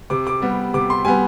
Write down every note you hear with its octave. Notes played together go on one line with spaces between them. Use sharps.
C3 D6
D6
G3 B3
C3 D6
C6
G3 B3 G#5